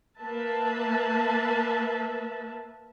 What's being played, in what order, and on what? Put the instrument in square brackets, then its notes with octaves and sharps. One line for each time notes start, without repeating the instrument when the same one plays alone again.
[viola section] A#3 B4 E5 A5